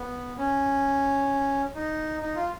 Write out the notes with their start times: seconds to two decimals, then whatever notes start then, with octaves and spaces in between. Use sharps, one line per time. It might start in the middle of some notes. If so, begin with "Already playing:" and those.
Already playing: B3
0.38 C#4
1.75 D#4
2.22 D#4
2.35 F4